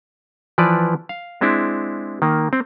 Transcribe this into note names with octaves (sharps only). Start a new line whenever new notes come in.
E3 F3 B4 D5
F5
G#3 C4 D4 E4
D#3 A#3
C4